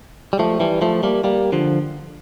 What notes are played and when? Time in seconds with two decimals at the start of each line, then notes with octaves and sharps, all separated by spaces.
0.33 G3
0.39 F3 A3
0.60 E3 G3
0.82 F3 A3
1.03 G3 A#3
1.24 G3 A#3
1.52 D3 F3